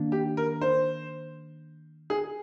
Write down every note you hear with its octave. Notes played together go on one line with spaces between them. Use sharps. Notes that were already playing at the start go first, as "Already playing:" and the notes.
Already playing: D#3 A#3 D4
G4
A#4
C5
G#4